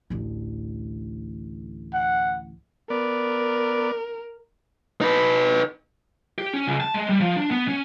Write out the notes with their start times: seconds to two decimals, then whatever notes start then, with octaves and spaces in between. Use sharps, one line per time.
0.10 A1 D2
1.94 F#5
2.90 B3 A#4 D5
5.01 D#4 B4
6.38 G4
6.53 C#4
6.66 C#2
6.80 A5
6.94 G#3
7.09 G3
7.20 F3
7.37 D4
7.51 B3
7.68 C#4